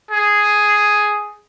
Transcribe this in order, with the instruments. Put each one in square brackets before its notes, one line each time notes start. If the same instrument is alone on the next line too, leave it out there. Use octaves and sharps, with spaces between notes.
[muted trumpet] G#4